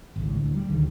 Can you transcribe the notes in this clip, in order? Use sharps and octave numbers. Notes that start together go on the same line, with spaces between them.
G#1 C#2
D2 A2
G3
D2 D#3 G3